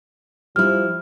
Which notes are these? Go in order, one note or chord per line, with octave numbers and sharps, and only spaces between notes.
F3 G3 E4 F6